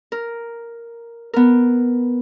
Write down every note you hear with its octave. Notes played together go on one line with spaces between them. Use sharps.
A#4
B3 A#4